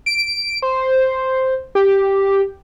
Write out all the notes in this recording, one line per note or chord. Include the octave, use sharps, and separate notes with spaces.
D7
C5
G4